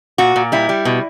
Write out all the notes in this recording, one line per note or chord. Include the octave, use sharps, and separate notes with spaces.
A#2 F#4
A#2
G3 E4
G3
B2